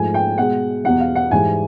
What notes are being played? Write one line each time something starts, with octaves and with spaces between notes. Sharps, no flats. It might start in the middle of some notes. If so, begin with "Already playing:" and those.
Already playing: G#2 F3 A3 G#5
G5
B2 G#3 F#5
E2 B2 G3 F#5
F5
F#5
G#2 E3 G3 G#5